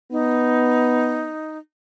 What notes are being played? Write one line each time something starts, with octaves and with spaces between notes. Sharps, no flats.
B3 D#4